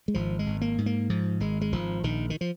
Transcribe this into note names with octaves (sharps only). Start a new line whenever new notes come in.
G#3
G#1 F3
G#3
G#1
A#3
G#2
A#3
G#2 F3
G#1 G#3
G#3
G#1 F3
A#1 D#3
D#3
F3